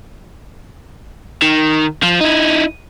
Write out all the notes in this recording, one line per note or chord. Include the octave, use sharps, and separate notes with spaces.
D#3
F3
D#4 E4